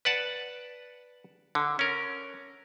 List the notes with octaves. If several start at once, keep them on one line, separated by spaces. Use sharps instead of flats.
B4 D5 F#5 A5
D3
C#4 A#4